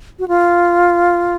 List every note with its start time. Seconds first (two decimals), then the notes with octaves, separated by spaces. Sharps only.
0.19 F#4
0.28 F4